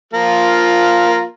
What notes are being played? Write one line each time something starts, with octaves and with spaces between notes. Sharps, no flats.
F3 A#3 F4